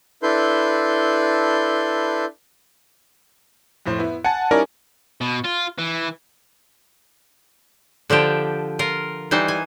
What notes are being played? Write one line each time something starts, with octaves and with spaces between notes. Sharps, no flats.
D4 E4 A4 B4 C6 G6
F2 A2 C5
B3 E4
F#5 G#5 A5 C#7
G3 C#4 D#4 E4 A#4 D5
B2
F4
E3
D3 F3 D4 G4
F4 A#4
E3 G3 D#4 C5
G#5